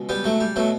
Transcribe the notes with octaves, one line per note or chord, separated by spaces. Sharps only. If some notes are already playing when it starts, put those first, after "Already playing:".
Already playing: C#2 B2
G3 B3
F#3 A3
G3
B2 F#3 A3